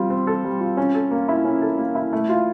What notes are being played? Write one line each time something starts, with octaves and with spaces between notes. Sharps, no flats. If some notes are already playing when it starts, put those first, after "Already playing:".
Already playing: G3 C4 F4
C4
A4
G3
F4
C#4
A4
A#3
E4
C#4
A4
A#3
E4
A3
F4